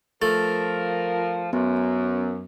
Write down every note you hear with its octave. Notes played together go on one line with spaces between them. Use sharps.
F3 A3 A#4 A6
F#2 B3